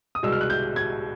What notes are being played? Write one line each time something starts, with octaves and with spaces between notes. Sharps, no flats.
D#6
C2 B2 G#3 E6
F6
F#6
G6
G#6